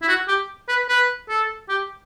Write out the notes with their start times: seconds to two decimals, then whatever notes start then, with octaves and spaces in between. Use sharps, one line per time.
0.02 E4
0.08 F#4
0.28 G4
0.68 B4
0.88 B4
1.29 A4
1.69 G4